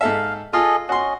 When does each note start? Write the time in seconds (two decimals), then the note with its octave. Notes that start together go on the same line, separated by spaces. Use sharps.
0.01 G#2 A4 E5 F5
0.53 F4 G#4 A4 D#5
0.89 C#4 F#4 D#5 C6